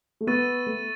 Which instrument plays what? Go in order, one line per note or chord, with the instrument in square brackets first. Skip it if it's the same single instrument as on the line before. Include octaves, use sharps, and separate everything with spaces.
[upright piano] A3
[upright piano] B3 [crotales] C#6 E6 A6 D#7
[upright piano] A3